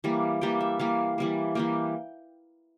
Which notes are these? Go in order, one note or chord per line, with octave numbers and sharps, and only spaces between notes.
E3 G3 A#3
E3 G3 A#3 G5
E5
E3 G3 A#3 F5
E3 G3 A#3
E3 G3 A#3 G5